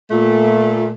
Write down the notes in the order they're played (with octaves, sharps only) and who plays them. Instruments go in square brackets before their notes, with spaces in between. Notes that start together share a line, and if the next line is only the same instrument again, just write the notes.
[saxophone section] A#2 A3